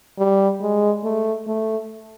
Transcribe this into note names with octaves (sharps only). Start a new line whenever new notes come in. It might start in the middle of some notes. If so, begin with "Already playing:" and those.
G3
G#3
A3
A3